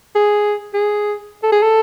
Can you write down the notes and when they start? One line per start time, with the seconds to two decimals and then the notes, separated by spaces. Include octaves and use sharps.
0.15 G#4
0.74 G#4
1.43 A4
1.52 G#4
1.62 A4